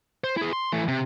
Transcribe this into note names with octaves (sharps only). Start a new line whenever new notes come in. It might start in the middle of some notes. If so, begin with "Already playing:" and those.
C5
E4 G#4
C6
E3 A3
C3